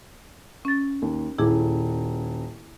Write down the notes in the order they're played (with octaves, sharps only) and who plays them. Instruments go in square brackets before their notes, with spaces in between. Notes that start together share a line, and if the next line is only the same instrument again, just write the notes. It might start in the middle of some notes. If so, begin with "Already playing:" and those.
[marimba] C#4 A6
[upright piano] D#2
[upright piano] D#1 [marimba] E4 G#4 D6